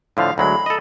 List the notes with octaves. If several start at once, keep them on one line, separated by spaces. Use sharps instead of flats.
A2 D3 F3 F5
D2 F#3 G#3 B5
A4 D#5